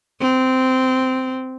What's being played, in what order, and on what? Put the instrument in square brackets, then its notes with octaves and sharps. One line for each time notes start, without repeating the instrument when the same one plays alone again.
[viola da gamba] C4